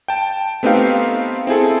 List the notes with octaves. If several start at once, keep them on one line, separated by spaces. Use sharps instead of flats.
G5 A5
A3 B3 C4 D#4 G4 F5
C4 E4 G#4 A4